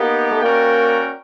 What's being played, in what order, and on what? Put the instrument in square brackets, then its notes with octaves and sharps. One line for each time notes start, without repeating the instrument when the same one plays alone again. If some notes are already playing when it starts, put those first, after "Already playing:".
Already playing: [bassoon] A#3 [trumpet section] B3 D#4 G4
[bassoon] A3
[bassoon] A#3 [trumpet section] C#4 F#4 A#4 D5 G5